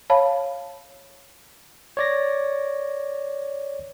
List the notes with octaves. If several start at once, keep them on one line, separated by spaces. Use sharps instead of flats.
C#5 F5 A5 B5
C#5 D5 A#6